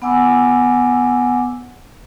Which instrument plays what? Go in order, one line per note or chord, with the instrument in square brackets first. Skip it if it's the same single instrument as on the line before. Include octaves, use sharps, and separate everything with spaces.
[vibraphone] B3 F#5 G#5 D6 E6